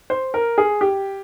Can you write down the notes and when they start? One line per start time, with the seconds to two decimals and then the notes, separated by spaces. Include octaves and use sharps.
0.10 C5
0.34 A#4
0.58 G#4
0.81 G4